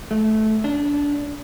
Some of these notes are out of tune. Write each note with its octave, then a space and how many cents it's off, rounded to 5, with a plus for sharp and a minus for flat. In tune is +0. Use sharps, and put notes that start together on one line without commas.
A3 -15
D4 -20